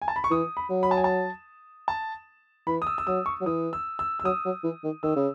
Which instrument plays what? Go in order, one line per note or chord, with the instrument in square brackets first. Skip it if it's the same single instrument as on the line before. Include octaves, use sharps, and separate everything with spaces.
[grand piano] G#5
A5
B5
C#6
[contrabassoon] E3 [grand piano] D#6
[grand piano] B5
[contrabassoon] F#3
[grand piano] B5
A5
G#5
A5
A5
[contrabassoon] E3 [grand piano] B5
[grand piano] D#6
E6
E6
[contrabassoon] F#3 [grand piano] D#6
[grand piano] C#6
[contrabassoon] F#3
[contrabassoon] E3 [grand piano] D#6
[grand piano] E6
E6
E6
[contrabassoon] F#3 [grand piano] D#6
[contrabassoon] F#3
E3
D#3
[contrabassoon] D#3 [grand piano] E6
[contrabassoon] C#3